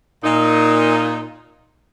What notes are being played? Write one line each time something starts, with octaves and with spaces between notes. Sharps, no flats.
A#2 D#4